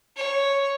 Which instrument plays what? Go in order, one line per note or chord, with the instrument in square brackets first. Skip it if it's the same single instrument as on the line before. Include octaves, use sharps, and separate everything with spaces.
[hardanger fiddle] C#5